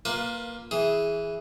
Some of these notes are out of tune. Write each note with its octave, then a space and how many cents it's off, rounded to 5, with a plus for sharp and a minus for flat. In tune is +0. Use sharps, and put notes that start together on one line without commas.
A#3 +0 F4 +20 B4 -15
E3 -5 G#4 +0